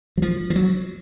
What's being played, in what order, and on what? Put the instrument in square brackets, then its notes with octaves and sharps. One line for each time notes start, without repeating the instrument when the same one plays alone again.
[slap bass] F#3
F3
F3
F#3